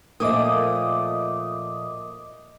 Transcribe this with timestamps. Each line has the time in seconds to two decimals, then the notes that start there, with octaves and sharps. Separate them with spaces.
0.20 A#2 F3 A3 D#5 D6 D#6